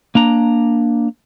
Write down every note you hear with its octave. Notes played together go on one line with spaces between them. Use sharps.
A#3 D4 A#5